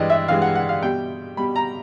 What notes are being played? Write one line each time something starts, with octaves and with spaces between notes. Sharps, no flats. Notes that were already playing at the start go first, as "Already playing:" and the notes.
Already playing: G2 E3 G#3 D5 D#5
E5
G2 E3 G#3 F5
F#5
F#5
F5
B2 G3 G5
B2 G3 B5
A#5